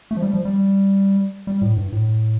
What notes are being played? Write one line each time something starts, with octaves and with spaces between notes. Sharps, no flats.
A3
F3
G3
F3
G3
G3
A2
G2
A2